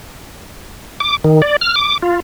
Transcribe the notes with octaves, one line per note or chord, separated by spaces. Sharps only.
D6
D#3
D5
F6
D6
F4